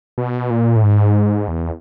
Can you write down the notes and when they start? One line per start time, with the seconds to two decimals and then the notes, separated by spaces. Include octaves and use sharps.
0.18 B2
0.50 A#2
0.76 A2
0.83 G#2
1.48 E2